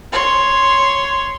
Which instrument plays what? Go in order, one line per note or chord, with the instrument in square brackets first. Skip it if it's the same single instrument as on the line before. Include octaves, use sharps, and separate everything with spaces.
[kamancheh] C#5 C6